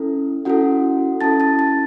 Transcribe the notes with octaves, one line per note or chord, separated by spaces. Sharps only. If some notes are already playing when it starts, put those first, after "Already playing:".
Already playing: C#4 E4 A4
C#4 E4 F#4 A4 F#5
C#4 E4 A4 A5 A6
A5 A6
A5 A6